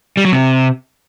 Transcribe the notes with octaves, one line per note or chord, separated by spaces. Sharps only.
G3
F#3
C3